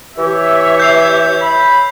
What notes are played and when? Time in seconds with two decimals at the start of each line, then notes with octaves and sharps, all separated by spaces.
0.18 E3 G4 C#5 E5
0.80 G6 C7 F7
1.41 B5